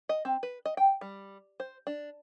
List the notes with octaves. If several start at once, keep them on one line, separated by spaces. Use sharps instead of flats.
D#5
C4
B4
D#5
G5
G3
C5
D4